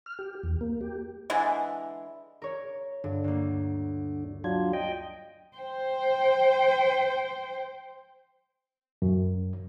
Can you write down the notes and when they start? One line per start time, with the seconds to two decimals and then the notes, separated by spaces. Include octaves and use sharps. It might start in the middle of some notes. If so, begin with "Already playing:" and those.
0.06 F6
0.19 G4
0.43 E2
0.61 A#3
0.81 G4
1.30 D3 E3 G#3
2.42 A#4 C#5
3.04 G2 D3
3.24 D2 A#3
4.44 F#3 D4 F4 G#6
4.73 D#5 G5
5.57 C5 G5
9.02 F#2